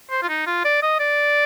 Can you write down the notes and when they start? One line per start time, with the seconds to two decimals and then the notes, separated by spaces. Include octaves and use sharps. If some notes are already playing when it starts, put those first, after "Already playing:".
0.11 C5
0.22 F4
0.29 D#4
0.46 F4
0.65 D5
0.82 D#5
1.00 D5